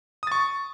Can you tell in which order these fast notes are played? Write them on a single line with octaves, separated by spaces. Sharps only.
D#6 A6 C#6